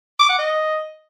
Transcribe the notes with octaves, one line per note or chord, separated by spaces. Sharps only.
D6
F#5
D#5